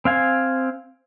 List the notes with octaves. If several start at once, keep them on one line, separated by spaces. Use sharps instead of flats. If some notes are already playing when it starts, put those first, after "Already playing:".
C4 F5 G#5